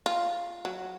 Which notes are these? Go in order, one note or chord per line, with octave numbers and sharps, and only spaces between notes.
F4
F#3